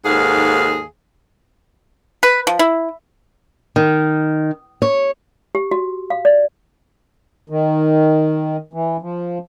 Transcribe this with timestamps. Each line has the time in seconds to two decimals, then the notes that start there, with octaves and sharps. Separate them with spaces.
0.05 D#2 G#2 G#4 A4 F5
2.23 B4
2.47 F3
2.59 E4
3.76 D#3
4.82 C#5
5.55 G4
5.71 F#4
6.10 F5
6.25 D5
7.49 D#3
8.73 E3
9.02 F3